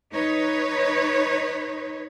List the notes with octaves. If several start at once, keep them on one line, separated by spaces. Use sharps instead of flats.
D#4 B4 C#5